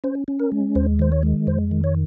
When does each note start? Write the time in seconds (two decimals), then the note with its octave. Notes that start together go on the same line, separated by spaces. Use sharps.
0.04 C#4 C5
0.28 C#4
0.40 A#4
0.52 G#3
0.75 D#2 C5
0.99 D#3 C5
1.12 C#5
1.23 G#3
1.47 F2 C5
1.71 D#3
1.84 C#5